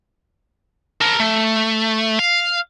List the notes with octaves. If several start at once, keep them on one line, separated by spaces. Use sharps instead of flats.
A#4 A5
A3
F5